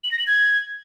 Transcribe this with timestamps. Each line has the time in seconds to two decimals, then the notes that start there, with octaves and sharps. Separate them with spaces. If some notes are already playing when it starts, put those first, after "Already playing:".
0.04 F#7
0.11 A#6
0.19 F#7
0.27 G#6